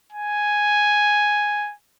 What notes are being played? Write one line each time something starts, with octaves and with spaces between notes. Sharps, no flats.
G#5